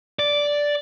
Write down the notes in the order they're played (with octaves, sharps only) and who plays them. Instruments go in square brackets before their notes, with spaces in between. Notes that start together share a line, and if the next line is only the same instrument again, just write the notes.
[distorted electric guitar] D5